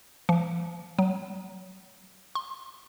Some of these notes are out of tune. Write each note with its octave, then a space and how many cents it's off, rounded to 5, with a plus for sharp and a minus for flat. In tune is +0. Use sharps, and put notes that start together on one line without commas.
F3 -40
F#3 +10
C6 +15